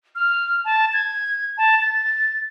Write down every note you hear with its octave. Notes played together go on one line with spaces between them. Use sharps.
F6
A5
G#6
A5
A6